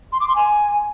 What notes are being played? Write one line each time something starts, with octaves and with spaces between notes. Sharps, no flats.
C6
D6
C6
G#5